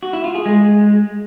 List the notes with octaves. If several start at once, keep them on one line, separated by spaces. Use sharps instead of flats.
F#4
E4
F4
G#4
G#3